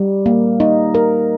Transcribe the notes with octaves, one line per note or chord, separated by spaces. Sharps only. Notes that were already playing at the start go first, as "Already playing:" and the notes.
Already playing: G3
A#3
D#4
A#4